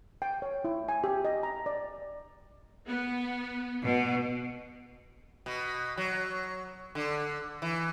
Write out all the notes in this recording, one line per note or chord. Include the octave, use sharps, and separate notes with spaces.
G5
C#5
E4
G#5
G4
D#5
A#5
D5
B3
B2
B2
F#3
D3
E3